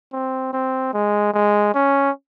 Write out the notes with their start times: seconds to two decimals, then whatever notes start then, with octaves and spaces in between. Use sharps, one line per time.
0.13 C4
0.53 C4
0.94 G#3
1.34 G#3
1.75 C#4